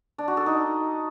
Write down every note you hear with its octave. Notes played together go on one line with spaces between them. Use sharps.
D4
F#4
A4
D#4